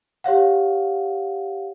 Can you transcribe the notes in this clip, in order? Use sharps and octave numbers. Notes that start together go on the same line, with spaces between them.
G4 C#5 F5 F#5